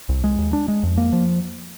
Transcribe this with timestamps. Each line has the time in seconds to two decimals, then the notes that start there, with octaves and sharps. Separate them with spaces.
0.09 C2
0.24 G#3
0.38 D#2
0.53 D4
0.68 G#3
0.83 F2
0.97 A#3
1.12 F3